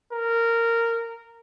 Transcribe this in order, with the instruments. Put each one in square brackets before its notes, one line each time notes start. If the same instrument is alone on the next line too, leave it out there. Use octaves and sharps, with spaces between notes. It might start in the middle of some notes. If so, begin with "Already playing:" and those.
[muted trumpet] A#4